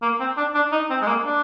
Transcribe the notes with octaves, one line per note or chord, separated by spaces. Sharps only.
A#3
C4
D4
D4
D#4
C4
G#3
A#3
D4